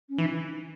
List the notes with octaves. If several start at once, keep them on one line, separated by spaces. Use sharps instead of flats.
C#4
E3 D#4